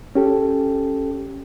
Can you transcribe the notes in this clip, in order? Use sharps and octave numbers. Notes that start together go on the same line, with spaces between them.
C#4 G4 A4